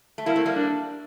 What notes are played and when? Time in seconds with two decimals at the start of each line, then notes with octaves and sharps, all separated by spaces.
0.18 A3
0.26 G3 A#3 E4
0.36 A3 C4
0.45 G3 A#3
0.56 D4